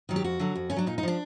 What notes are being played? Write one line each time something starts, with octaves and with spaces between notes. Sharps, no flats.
D#3 F#3
G4
F2 F#4
D3 F#3
F2
D3 C#4
F#3 D4
A#2 D#4
D#4
F3 D4